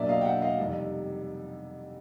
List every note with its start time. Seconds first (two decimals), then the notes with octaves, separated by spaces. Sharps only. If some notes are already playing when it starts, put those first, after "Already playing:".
Already playing: B2 F#3 A#3 D4 D5 E5
0.09 D#5 F5
0.21 G5
0.25 E5 F#5
0.42 D#5 F5
0.58 F2 C3 D#3 G3